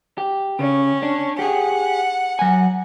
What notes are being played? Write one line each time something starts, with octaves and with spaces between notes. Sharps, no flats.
G4
C#3 C#4
D4
G4 G#4 F#5
F#3 G#5